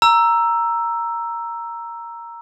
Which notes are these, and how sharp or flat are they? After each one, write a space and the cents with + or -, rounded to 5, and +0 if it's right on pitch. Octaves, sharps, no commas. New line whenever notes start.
A#5 +0 E6 +5